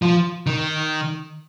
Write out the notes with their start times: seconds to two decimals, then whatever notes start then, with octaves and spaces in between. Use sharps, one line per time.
0.02 F3
0.46 D#3